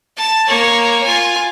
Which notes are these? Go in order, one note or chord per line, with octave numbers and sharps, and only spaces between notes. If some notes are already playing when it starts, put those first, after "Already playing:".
A5
A#3 C#5
F4 G#5